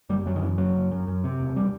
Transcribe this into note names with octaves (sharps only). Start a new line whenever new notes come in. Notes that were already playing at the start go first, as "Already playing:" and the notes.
F#1 G3
F#2 F#3
D#3
F#2 E3
F#1 F#3
F#1
F#2
F#2
C3
E1
G3